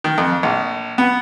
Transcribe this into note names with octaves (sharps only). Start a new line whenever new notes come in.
D#3
F2
A#1
B3